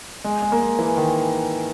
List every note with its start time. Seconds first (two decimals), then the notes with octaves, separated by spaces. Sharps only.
0.24 G#3
0.42 G#3
0.52 A#3
0.61 G#3
0.79 E3
0.97 D#3